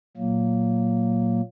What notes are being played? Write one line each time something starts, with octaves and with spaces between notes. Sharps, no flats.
A#2 F#3 A#3